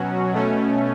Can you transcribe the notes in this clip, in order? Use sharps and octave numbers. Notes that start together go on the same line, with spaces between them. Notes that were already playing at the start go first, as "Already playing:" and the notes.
Already playing: B2 F#3 C#4 F#4
B2 A3 C#4